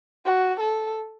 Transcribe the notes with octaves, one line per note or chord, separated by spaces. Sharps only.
F#4
A4